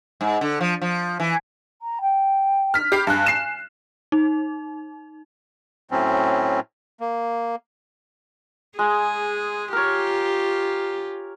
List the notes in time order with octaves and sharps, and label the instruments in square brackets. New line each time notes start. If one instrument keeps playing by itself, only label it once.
[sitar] G#2
D3
F3
F3
E3
[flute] A#5
G5
[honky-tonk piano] F6 B6
[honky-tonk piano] G4 C7 [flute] B5
[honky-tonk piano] G2 F#6 [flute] G#5
[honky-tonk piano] C7 E7
[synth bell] D#4
[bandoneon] A2 F#3 C4 C#4
A#3
[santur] G#3 [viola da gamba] G#4
[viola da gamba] F4 G4 [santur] A#4 C#5